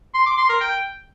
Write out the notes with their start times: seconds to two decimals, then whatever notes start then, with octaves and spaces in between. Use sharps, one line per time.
0.14 C6
0.26 D6
0.38 C6
0.49 A#4
0.61 G5